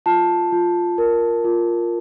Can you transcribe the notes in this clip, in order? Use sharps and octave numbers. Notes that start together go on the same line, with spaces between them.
F4 A5
F4
A#4
F4